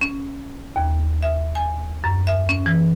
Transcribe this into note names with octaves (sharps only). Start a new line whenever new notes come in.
C#4
D#2
E5
G#5
F#2
E5
C#4
E3